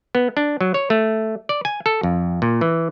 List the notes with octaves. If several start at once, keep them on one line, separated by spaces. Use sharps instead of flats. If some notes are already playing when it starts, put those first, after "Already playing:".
B3
D4
F#3
C#5
A3
D5
G#5
A4
F2
A#2
E3